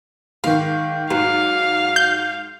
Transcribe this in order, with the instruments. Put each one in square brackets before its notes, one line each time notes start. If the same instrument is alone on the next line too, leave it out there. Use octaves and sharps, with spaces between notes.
[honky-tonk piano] G#2 D#3 [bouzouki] F5
[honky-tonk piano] G#2 [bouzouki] F#3 [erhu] F5
[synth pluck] G6